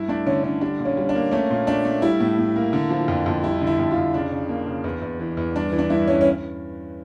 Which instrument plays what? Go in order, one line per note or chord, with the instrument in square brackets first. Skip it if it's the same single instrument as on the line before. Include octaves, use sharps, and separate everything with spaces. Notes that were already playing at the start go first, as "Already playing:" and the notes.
Already playing: [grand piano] G2 E4
A3 D4
D3 C#4
D3 C#4
G3 D4
A#2
C#4
G3
D4
A#3
A3 C#4
A#2
A3 D4
A3
G3 E4
A2
A2
A#3
D3
F3
F2
F2
G3 E4
D3
E4
F2
F4
F2
C#3 D4
C#3
A#3
C#3
E2
E2
E3
E2
G2 D4
E3
D4
G2 E4
G2 C#4
C#4